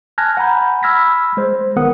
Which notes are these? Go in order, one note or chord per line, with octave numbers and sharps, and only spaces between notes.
G#5 A5 F6 F#6 G#6 A#6
F#5 G#5 A#5 B5 G6
B5 E6 F6 G#6 A#6 B6
G#3 C5
B1 D#3 B3 A#4 F#5 D#6